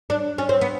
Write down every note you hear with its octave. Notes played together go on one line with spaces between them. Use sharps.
D4
C#4
C4
B3